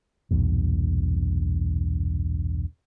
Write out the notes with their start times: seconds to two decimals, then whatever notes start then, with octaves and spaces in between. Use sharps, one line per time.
0.31 B1 E2 G2 A#2